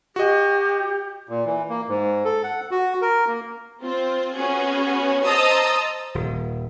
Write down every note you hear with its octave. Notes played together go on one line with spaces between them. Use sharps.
F#4 G4 D#5
A#2
E3
A#3
G#2
A4
F#5
F#4
A#4
A#3
C4 F4 C5
B3 C#4 F#4 G#4
C5 D#5 A5 A#5 D#6 E6
D#1